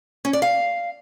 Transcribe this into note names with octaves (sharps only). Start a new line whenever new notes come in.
C#4
D5
F5